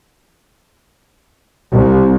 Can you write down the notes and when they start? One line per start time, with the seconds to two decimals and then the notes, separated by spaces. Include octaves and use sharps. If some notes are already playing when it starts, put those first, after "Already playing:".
1.72 C2